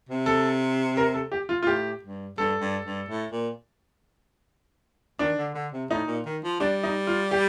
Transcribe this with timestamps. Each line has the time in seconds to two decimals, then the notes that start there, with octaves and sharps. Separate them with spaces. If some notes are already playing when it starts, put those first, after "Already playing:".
0.09 C3
0.26 A4
0.97 A#4
1.14 A4
1.32 G4
1.49 F4
1.63 F4
1.67 A2 G4
2.03 G2
2.38 G2 A4
2.61 G2
2.85 G2
3.09 A2
3.32 A#2
5.19 D#3 D4
5.38 D3
5.55 D3
5.72 C3
5.90 A2 D#4
6.07 A#2
6.25 D#3
6.43 F3
6.60 G3 D4
6.83 D#4
7.07 F4
7.31 G4